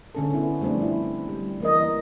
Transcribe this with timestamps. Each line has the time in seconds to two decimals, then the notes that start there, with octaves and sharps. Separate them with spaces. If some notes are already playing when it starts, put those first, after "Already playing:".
0.15 D3 C#4 A4
0.34 B3 E4
0.61 F3 G3 A3 C4 D4
0.82 E4
1.29 G3
1.60 E3 A#3 A#4 D#5